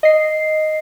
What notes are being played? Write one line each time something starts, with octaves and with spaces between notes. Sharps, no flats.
D#5 C7